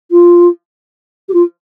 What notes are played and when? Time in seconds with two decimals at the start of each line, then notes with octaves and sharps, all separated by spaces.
0.11 F4
1.28 G4
1.33 F4